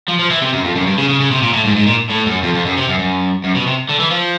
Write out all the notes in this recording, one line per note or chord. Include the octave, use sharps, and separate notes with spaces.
F3
F3
E3
C3
F#2
F2
F#2
G2
C#3
C#3
C#3
C3
A#2
A2
G#2
G#2
A#2
A2
F#2
F2
F2
F#2
C3
F#2
F#2
F#2
B2
C3
D3
E3
F3